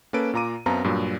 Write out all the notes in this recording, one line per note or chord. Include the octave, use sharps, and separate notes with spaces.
A#3 C#4 A4 B4 D7
A#2 F4 A#5 D6 D#7
F#2 B3 C4 F5 A5 A#5
G2 A#2 F#3